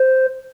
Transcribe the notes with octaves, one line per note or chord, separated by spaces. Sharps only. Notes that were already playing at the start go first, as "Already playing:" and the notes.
Already playing: C5